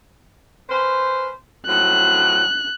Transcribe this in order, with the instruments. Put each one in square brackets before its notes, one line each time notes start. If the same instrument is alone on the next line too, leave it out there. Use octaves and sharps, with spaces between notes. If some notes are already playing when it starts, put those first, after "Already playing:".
[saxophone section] C#4 B4 C5
[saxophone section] A2 F3 F#3 [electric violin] F#6